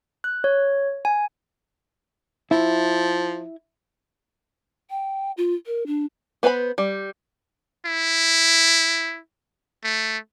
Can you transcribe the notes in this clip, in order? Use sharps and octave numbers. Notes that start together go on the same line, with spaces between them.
F#6
C#5
G#5
F3 E4
G5
F4
A#4
D4
B3 B4 C5 G#5 B5
G3
E4
A3